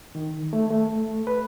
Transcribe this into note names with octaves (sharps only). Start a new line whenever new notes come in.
D#3
A3
A3
B4